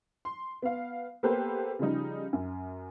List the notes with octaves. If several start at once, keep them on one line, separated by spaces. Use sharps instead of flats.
C6
B3 F5
A#3 B3 G4 A4 B4 C5
C#3 F3 G3 D#4
F#2